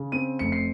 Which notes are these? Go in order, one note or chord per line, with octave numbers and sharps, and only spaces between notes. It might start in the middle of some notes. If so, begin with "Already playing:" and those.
Already playing: C#3
C4 D#7
F1 C#7
C7